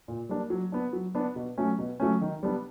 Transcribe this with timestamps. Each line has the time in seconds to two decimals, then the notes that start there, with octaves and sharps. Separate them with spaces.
0.08 A#2
0.29 G3 A#3 D4
0.50 F#3
0.72 B3 D4
0.93 F#3
1.15 B3 D4
1.36 B2
1.57 F#3 A3 C#4
1.79 B2
2.00 F#3 A3 C#4
2.21 D#3
2.43 G3 B3 D4